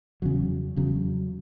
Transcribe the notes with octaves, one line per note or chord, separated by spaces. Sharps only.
E2 C#3 F#3
E2 C#3 F#3